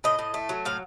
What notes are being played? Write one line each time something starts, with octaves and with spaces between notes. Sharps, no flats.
A2 D#5
A2
A3
F#3
A2 F5